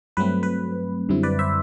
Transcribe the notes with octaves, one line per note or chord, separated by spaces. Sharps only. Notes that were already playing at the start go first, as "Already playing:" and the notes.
G2 F#3 A3 C4 B4
B4
F#2 D3 G3 C4 E4
B4 D5
C5 E5